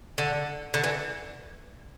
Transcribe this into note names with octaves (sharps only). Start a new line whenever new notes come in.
D3
D3
E3